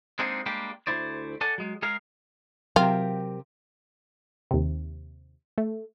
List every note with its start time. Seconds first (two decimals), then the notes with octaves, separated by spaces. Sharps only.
0.19 G#3 A#3 C4 D4 D#4 G#4
0.46 G3 G#3 A#3 D4 G4
0.87 D2 D#3 A3 E4 C5 D5
1.41 A4 D5 F#5 G#5 A5
1.58 F#3 G#3
1.82 G#3 G#4 A#4 F5
2.76 C3 F#3 F4 A#4 G5
4.51 D#2 C3
5.58 A3